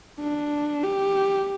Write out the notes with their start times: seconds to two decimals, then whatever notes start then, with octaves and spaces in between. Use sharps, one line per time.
0.20 D4
0.83 G4